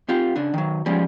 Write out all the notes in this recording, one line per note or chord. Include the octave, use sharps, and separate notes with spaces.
C4 F4 G4
C#3 D4
D#3 F#3
F3 G3 G#3 C#4